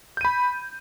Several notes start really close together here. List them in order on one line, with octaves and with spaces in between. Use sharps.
G6 D#7 B5